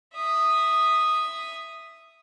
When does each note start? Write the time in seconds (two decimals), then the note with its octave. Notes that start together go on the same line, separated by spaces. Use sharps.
0.15 E5 D#6